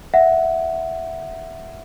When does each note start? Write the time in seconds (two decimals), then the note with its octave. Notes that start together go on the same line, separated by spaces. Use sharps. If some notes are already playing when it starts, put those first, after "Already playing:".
0.14 E5 F#5